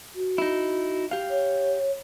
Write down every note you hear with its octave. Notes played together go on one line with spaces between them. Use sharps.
F#4
D#4 E4
G4 F5
C#5